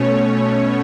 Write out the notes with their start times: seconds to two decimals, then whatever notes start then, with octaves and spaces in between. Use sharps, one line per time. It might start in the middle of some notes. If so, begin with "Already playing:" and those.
Already playing: B2 A3 C#4 C#5